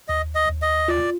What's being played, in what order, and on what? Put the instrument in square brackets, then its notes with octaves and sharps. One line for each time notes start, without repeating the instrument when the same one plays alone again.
[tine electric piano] D#2 [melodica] D#5
[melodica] D#5
[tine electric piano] D#2
[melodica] D#5
[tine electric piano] F4 [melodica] D5